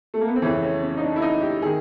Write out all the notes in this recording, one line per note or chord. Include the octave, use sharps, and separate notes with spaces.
A3
A#3
B3
C4
F2 C#3 E3 C#4
C#4
C#4
D#4
D4
E4
D#4
G4
D#3 G#4